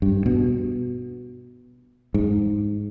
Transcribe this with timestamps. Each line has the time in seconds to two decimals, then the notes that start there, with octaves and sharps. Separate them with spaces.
0.02 G2
0.26 B2
2.14 G#2